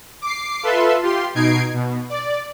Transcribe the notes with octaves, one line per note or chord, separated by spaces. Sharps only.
D6 C7
F4 A4 B4 E5 C6
F4 G4 C6
B2 D#4 G#6 C7 D7
B2
D5